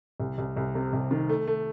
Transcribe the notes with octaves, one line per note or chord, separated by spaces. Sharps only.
C2
C2
C2
C3
C2
D#3
A3
A3